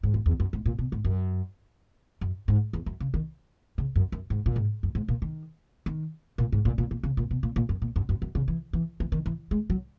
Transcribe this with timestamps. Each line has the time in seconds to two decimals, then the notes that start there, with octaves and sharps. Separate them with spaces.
0.03 G#2
0.14 F#2
0.26 E2
0.40 F#2
0.53 G#2
0.66 A#2
0.79 B2
0.92 G#2
1.05 F#2
2.21 F#2
2.48 G#2
2.73 E2
2.86 F#2
3.00 C#3
3.14 D#3
3.78 C#3
3.95 F#2
4.12 F#2
4.30 G#2
4.46 A#2
4.56 G#2
4.83 F#2
4.95 G#2
5.08 A#2
5.22 D#3
5.86 D#3
6.38 A#2
6.52 G#2
6.65 A#2
6.78 A#2
6.91 A#2
7.03 C#3
7.17 A#2
7.31 B2
7.43 A#2
7.56 A#2
7.69 F#2
7.82 A#2
7.96 F#2
8.09 F#2
8.22 F#2
8.35 C#3
8.48 E3
8.73 E3
9.00 E3
9.12 D#3
9.26 E3
9.51 G#3
9.70 F#3